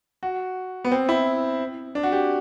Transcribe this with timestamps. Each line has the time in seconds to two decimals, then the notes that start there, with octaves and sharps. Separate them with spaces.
0.23 F#4
0.85 B3
0.91 C4
1.09 E4
1.95 D4
2.03 F#4
2.12 G4